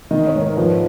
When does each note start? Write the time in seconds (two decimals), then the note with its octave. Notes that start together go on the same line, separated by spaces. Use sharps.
0.11 D#3 D#5
0.27 C#5
0.35 G#2
0.42 A#4
0.57 F3 B4